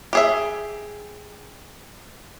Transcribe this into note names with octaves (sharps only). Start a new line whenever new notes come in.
G4 G#4 E5